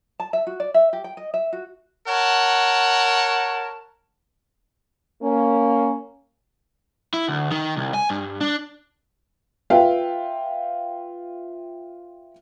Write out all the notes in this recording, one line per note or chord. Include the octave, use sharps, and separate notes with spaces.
A5
E5
F#4
D5
E5
G4
G5
D#5
E5
F#4
A#4 C#5 F#5 A5
A#3 C#4
E4
D2
D#3
C2
G#5
G2
D4
F4 B4 E5 F5 G5